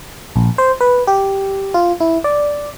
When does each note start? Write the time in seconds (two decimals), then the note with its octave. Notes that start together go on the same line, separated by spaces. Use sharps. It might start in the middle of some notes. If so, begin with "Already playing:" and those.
0.36 A#1
0.58 C5
0.81 B4
1.07 G4
1.74 F4
2.00 E4
2.24 D5